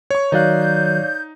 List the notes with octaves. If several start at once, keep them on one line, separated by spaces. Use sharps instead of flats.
C#5 C#6
D#3 F#3 D#4 C#5 D5 F5 F#6 G6